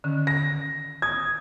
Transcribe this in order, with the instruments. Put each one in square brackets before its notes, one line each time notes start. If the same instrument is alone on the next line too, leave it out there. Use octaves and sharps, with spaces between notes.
[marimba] D3 D#3 C#4
[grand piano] A#6
D#6 G#6